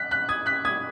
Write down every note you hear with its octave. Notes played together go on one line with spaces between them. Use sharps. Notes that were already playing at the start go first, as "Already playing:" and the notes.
Already playing: F#6 B6
F#6 B6
D#6 G#6
F#6 B6
D#6 G#6